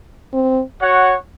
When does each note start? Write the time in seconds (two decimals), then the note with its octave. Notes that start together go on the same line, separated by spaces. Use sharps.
0.33 C4
0.81 F#4 C#5 F#5